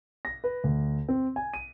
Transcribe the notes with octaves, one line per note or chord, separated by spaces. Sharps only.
A#6
B4
D2
C4
G#5
D#7